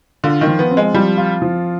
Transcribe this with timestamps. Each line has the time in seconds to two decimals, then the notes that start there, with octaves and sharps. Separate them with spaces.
0.24 D3 F4
0.41 D#3
0.47 F3
0.59 B3
0.71 C4
0.77 G#3
0.94 F3 G3
1.17 F4
1.42 F3